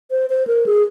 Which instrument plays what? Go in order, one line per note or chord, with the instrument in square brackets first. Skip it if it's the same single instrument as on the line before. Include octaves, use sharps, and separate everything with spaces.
[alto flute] C5
C5
A#4
G#4